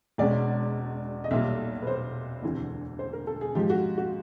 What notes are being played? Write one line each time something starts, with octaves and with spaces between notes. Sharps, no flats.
E1 E2 B2 G#3 C#4 D5
D#5
B1 A#2 G3 E5
B4
C5
E1 D2 C3 E3
C5
A#4
A4
G#4
G#2 F3 G#3 G4
F#4
F#4